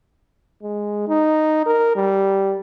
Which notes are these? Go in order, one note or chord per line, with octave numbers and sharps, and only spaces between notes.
G#3
D#4
A#4
G3